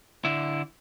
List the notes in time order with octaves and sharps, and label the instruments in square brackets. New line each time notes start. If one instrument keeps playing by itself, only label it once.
[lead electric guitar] D3 E4